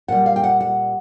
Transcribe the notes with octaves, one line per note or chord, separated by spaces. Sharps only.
A#2 G3 F#5
F5
G5
F#5
F#5